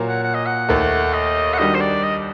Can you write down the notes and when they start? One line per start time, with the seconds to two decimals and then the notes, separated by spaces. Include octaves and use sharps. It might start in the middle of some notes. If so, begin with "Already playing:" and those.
Already playing: A#2 F#3 A#3
0.08 F#5
0.23 F#5
0.35 D#5
0.46 F#5
0.69 D#2 D#3 A3
1.14 D#5
1.54 F#5
1.59 D#3 G3 D4 F#4 D#5
1.75 C5
1.81 D5
2.04 D#5